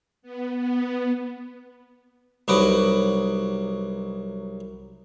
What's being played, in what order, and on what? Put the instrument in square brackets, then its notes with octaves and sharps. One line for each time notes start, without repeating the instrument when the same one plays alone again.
[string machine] B3
B3
[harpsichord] C2 F#3 D#4 B4 D6